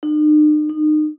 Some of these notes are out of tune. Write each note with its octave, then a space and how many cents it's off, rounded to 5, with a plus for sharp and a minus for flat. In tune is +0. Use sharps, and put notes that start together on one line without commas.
D#4 -45
D#4 -30